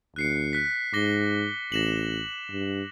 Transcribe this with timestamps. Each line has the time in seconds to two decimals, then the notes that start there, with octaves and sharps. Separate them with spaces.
0.16 D2 F#6 C7 C#7
0.53 F#6 B6
0.93 G#2 D6 A#6 G7
1.72 A1 A#6 E7 F#7
2.51 G2